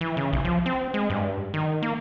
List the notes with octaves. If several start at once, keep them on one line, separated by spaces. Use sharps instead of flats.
E3
C#3
B1
F3
C4
G#3
G2
D#3
A#3